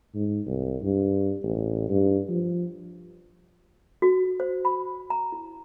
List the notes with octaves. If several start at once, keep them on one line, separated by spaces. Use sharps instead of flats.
G#2
C2
G2
A1
G2
F3
F#4
C5
B5
A#5
E4